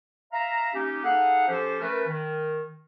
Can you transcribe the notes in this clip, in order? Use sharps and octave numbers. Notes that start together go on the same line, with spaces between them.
E5 F5 A#5
A#3 C#4 D#4 G4
D#4 G#4 A4 F5 F#5
F3 C#4 G4 A4 C5
A3 C#4 A#4 B4
D#3